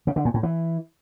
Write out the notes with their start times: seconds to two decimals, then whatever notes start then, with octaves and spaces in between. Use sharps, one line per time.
0.07 C#3
0.16 D3
0.25 A#2
0.34 A2
0.43 E3